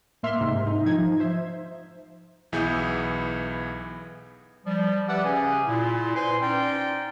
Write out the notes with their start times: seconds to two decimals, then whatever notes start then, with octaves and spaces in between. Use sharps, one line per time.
0.23 A2 A#3 E5 C6 F6
0.41 G#2 C3
0.66 D#4
0.86 F3 D#4 G#6
0.98 F3
1.20 C5 E5
2.52 B1 E3 B3 E4 G#4 G6
4.66 F3 G3
5.08 G4 B4 D5 E5 F#5
5.25 C#3 C#4 G4 G#4 G#5
5.67 A#2 E4
6.16 B4 C5 G#5 C6
6.41 C#4 D#4 D5 G5